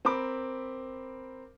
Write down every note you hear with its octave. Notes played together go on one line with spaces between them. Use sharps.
C4 A#4 B5 D6